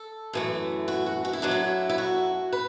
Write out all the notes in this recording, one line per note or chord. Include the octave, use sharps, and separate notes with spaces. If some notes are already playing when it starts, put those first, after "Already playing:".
Already playing: A4
F#2 E3 A3
F#4
F#4
F#4
E4
F#2 F#3 A3 D4
E4
E4
F#4
B4